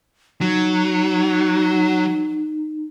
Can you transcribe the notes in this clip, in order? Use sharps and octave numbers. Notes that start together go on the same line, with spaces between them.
F#3 D#4